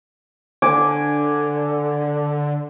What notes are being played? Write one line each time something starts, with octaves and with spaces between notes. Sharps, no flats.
D3 G#5 D6